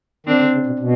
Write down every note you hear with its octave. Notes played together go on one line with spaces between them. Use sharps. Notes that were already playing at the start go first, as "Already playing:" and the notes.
D#3 C4 D4
D3
C#3
B2
B2